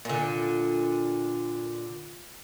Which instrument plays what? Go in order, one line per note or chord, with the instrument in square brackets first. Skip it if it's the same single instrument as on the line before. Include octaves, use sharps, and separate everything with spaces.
[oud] A#2 D3